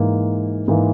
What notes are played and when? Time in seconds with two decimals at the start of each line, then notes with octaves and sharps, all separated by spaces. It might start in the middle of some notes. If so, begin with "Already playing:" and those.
Already playing: G#2 E3 A#3
0.68 G#2 E3 A#3